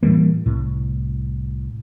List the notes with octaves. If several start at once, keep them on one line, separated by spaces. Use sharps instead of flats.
A2 E3 G3 A#3
C2 A2